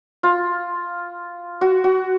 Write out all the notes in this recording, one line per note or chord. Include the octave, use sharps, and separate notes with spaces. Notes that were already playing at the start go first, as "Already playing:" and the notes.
F4
F#4
F#4